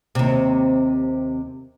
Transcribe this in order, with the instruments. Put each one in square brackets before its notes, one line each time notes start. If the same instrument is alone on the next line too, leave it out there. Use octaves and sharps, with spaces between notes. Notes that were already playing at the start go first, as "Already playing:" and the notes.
[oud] D#2 C3